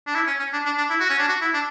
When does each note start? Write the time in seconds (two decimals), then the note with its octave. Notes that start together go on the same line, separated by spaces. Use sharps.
0.07 D4
0.15 E4
0.27 C#4
0.39 C#4
0.53 D4
0.65 D4
0.78 D4
0.90 E4
1.00 F#4
1.10 C#4
1.19 D4
1.28 F#4
1.41 E4
1.54 D4